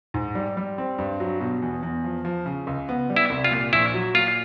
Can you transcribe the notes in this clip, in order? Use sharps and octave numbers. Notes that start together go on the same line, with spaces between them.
G#2
G3
G3
C4
G2
F#3
B2
E2
E2
F3
F3
C#3
C#2
B3
G3
E4
C2
F4
A#2
A#1 E4
F#3
A#2 F4